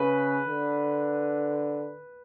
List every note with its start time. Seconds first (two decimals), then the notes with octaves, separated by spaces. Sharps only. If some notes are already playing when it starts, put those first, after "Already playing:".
Already playing: C#3 B4
0.48 D3